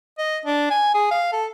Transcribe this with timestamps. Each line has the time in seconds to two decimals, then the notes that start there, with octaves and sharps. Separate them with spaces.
0.18 D#5
0.45 D4
0.70 G#5
0.94 G#4
1.11 F5
1.32 A4